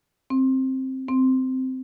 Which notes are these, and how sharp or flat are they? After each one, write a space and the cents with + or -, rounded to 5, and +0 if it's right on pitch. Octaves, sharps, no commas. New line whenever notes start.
C4 +10
C4 -10